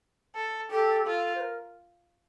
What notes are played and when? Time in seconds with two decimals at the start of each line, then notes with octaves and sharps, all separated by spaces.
0.36 A4
0.71 G4 A4
1.05 F4 A4
1.35 C5
1.41 A#4